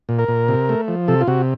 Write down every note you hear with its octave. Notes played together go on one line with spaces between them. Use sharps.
A#2
A#4
A#2
C3
A3
F3
C3 A4
F4
C3 F#4